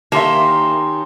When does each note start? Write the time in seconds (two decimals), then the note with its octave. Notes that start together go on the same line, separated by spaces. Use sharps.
0.12 D#3 A#3 C#4 G4 E5 A5 C6